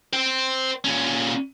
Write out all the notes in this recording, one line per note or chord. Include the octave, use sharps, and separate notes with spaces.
C5 G5
A#2 C#4